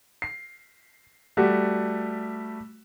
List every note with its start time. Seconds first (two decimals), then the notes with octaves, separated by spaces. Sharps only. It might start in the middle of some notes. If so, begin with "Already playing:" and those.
0.22 C7
1.37 G3 A3 F#4 G4